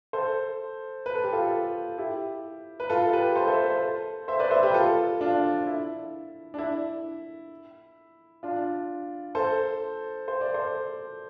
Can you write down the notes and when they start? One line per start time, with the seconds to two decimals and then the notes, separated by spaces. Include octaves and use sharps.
0.13 A4 C5
1.06 B4
1.15 A4
1.24 G4
1.33 F4 A4
1.98 E4 G4
2.80 B4
2.90 F4 A4
3.13 G4 B4
3.36 A4 C5
3.48 C5 E5
3.70 A4 C5
4.28 C5 E5
4.39 B4 D5
4.51 C5 E5
4.63 G4 B4
4.74 F4 A4
5.21 D4 F4
5.67 E4
6.54 D4
6.58 E4
8.43 D4 F4
9.35 A4 C5
10.28 C5
10.41 D5
10.54 A4 C5